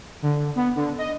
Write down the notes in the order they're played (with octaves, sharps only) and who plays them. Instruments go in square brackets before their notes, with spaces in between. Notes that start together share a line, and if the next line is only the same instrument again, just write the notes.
[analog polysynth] D3
B3
D3
D#5